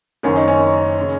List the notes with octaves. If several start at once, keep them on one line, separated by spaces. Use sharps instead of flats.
F#1 F#2 D#3 C#4
D#4
C#4
C#3